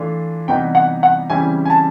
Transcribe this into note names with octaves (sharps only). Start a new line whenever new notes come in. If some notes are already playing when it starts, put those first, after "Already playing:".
Already playing: E3 A3 D4 F4
C3 E3 G3 B3 D#4 G5
F#5
F#5
C#3 E3 G3 C4 E4 G#5
G#5
A5